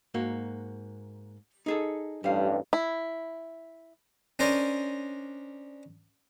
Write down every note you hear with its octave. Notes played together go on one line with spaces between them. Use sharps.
G#2 A#3 F#4
D#4 G#4 A4
A1 G2 G3 F5
E4
C#4 D4 A#4 C5 D5 D#5